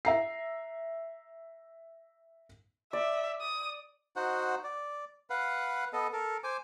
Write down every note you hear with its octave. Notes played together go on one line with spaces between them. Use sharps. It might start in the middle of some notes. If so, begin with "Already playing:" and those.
E5 A#5 C7
D5 E5
D#6
D#4 F#4 C5 F#5
D5
B4 F5 F#5
B3 A4 D#5
A4 A#4
C5 G#5 D6